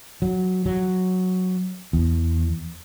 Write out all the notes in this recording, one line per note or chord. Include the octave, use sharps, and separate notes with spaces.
F#3
F#3
E2